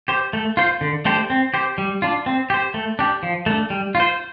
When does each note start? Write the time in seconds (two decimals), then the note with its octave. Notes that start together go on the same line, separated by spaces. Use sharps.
0.08 G4 C5
0.33 A3
0.57 F4 C5
0.81 D3
1.05 A3 D4 G4 C5
1.30 C4
1.54 G4 C5
1.78 G3
2.02 D4 F4
2.26 C4
2.50 G4 C5
2.74 A3
2.99 D4 G4
3.23 F3
3.46 A3 D4
3.70 G3
3.95 F4
4.00 C5